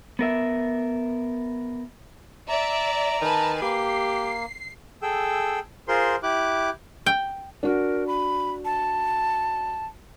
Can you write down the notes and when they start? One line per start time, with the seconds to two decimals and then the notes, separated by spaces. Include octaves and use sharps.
0.19 B3 A#4 E5
2.49 D5 E5 A#5
3.22 D#3 B4 G#5 A5
3.62 A#3 G4 C7
5.02 G#4 A4 G5 E6
5.88 F4 G#4 A#4 C5 C6
6.23 E4 G4 D6 F#6
7.06 G5
7.63 D4 F#4 A#4
8.07 B5
8.65 A5